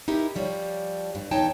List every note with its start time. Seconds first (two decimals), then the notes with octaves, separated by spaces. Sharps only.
0.08 D#4 E4 G4 A#4
0.35 F3 G3 C#5
1.15 G2
1.31 E2 D#4 C#5 G5 A5